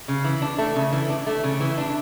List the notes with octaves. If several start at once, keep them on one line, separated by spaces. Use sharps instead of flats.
C#3
E3
D4
A3
C#3
E3
D4
A3
C#3
E3
D4